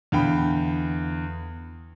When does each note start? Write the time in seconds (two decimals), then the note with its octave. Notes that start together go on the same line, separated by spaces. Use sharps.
0.12 E2 D3 F5 G5 B5